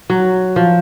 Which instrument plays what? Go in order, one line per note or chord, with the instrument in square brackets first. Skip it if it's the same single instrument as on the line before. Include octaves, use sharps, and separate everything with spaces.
[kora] F#3
F3